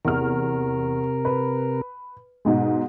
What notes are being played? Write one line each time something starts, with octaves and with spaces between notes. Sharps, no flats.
E2 C3 A#4 F6
B4
G#2 B2 G#3